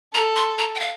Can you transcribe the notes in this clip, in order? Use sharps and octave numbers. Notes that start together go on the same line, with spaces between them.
A4 A#5
C6
A#5
G5
F5